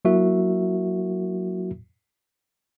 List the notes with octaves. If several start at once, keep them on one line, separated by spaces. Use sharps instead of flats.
F#3 A#3 E4 F#4 A#4 E5